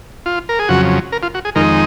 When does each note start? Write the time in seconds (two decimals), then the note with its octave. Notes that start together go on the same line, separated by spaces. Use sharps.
0.26 F4
0.49 A#4
0.59 G#4
0.68 F2 C#3 F#3 F#4
1.12 A#4
1.23 F4
1.34 F#4
1.45 G#4
1.55 F2 D#3 G#3 D#4 A#4